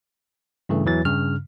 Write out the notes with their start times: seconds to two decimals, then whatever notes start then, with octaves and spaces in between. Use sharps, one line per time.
0.69 G2 C#3 E3 A3
0.86 E2 E3 F#3 A6
1.05 G2 C#3 F6